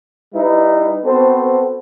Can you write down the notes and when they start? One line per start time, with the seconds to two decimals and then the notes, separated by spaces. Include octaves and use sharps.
0.34 G3 D#4 E4 B4
1.04 B3 C4 F#4 A4 B4 C5